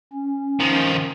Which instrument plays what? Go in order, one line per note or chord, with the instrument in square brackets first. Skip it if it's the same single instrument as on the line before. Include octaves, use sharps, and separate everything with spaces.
[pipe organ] C#4
[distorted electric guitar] D#3 F3